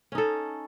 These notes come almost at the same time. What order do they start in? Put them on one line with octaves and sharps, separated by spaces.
C#4 D#4 A4